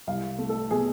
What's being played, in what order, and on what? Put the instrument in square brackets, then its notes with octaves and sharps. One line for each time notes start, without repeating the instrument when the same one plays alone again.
[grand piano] C2 [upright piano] F5
[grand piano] A3
[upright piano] A4
[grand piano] B2 [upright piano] G#4